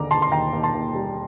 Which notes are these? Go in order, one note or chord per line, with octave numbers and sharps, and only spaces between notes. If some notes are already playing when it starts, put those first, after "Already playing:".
Already playing: D#2 D3 A#5 D6
D3 A5 C6
C6
D#2 G5 A#5
D#2
A5 C6
D#2
G3